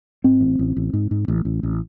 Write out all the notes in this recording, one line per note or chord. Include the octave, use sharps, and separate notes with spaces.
G#2 C4
A1
A1
A1
G#2
G#2
A1
A1
A1